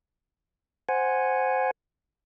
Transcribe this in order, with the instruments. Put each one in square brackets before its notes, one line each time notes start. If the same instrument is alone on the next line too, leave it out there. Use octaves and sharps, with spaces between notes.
[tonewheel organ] C5 F#5 G#5